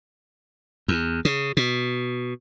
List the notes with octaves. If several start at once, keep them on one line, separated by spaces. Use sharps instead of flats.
E2
C#3
B2